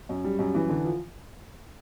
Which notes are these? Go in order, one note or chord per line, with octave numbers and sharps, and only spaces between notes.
F#2
G3
F#2
E3
D3
F3